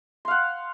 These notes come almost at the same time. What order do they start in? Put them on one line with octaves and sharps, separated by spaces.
C6 F5 F#5